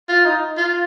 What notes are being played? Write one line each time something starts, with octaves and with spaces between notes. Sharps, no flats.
F4
D#4
F4